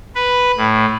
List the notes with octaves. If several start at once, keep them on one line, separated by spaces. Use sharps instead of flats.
B4
A2